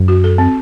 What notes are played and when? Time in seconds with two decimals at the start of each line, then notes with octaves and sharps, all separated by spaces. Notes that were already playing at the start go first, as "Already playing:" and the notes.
Already playing: F#2
0.08 F#4
0.24 A4
0.38 C4